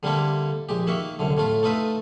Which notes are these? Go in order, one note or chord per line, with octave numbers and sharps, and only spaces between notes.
D3 G3 A#3 C4 E4 A4
A#1 G#3 G4
D#3 A#3 E5 C#6
C2 F#2 D3
A2 A3 F4
A3 D#4 F4 B4 E5